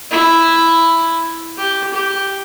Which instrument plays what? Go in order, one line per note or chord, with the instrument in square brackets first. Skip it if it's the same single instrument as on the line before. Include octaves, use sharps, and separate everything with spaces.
[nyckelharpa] E4
G4
G4